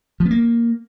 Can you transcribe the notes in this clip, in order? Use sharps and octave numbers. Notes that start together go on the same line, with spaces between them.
F3
B3
A#3